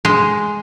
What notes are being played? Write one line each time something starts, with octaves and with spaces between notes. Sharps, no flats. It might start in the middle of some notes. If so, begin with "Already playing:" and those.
G#3